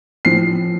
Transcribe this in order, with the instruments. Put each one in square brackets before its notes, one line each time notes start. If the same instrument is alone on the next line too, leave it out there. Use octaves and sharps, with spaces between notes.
[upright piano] A2 F3 C4 C7